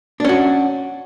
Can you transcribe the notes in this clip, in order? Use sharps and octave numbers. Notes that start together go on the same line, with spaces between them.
C#4 D4 F#4